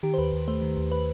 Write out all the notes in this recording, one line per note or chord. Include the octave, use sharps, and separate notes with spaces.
D#3 G4
C5
D#2 B4
D#2
A3 C5
D#3
D#2
B4